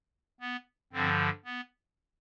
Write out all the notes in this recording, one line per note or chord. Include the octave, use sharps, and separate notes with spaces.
B3
G2 D3 F3 C4
B3